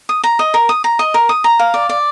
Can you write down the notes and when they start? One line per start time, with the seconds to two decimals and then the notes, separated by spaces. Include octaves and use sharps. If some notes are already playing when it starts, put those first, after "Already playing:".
0.09 D#6
0.24 A#5
0.39 D#5
0.54 A#4
0.69 D#6
0.84 A#5
0.99 D#5
1.14 A#4
1.29 D#6
1.44 A#5
1.59 F5
1.74 D5
1.89 D5